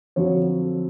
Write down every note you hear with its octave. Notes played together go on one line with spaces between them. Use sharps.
F2 D3 F#3 C#5